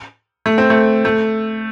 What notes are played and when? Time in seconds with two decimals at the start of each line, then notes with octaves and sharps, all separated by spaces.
0.46 A3
0.58 C4
0.70 A3
1.05 A3